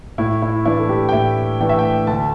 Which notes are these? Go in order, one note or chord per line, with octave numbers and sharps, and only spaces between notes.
A2 E4
E4
E3 A3 D4 E4
A4
G4
G5
A2 E5
E3 A3 D4 G5
E5
G5
D2 A5